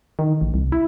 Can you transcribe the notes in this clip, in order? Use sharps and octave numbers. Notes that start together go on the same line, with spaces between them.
D#3
A1
C2
E4